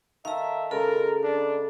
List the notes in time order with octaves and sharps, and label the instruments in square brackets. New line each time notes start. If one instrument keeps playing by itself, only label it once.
[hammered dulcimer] D#3 A4 A#4 [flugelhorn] E5 [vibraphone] F5 A#5
[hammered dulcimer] C#3 G#3 [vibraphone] A4 [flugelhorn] A#4
[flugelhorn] D4